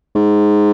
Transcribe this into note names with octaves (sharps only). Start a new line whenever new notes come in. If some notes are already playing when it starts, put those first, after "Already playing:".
G#2